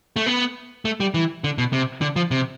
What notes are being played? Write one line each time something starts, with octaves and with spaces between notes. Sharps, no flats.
A3
B3
A3
G3
E3
D3
B2
C3
D3
F3
C3